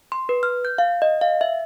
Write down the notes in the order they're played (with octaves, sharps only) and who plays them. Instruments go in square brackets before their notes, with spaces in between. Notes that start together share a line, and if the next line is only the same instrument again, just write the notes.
[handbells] C6
B4
F6
G6
F5
D#5
F5
E5